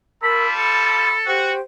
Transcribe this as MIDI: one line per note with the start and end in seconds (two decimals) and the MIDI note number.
0.23 1.11 55
0.23 1.11 65
0.23 0.45 70
0.23 1.11 81
0.23 0.52 83
0.23 0.45 88
0.57 1.34 69
0.57 1.14 83
1.27 1.53 66
1.27 1.60 67
1.27 1.60 72
1.27 1.60 79